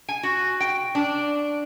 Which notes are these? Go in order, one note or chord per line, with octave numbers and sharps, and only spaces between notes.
G#5
F#4
G5
D4